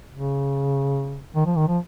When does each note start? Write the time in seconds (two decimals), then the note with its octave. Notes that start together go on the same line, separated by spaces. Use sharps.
0.12 C#3
1.35 D#3
1.46 F3
1.56 D#3
1.68 F3